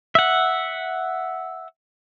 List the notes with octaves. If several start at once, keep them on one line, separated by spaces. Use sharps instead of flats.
E5 F#5